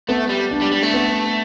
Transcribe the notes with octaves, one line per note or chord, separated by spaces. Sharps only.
A3 B3
G3
D4
G3
G3
A3
B3